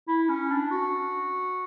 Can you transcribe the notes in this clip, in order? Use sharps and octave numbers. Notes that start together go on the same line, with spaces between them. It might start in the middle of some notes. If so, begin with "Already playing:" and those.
E4
C#4
D4
F#4